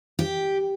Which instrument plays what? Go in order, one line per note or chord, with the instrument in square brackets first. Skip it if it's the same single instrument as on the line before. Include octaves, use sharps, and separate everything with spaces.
[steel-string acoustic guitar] G4